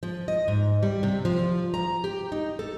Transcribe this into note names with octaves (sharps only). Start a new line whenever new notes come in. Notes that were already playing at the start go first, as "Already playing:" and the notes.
F3
D#5
G#2
G3
C3
F3
A#5
G4
D#4
A4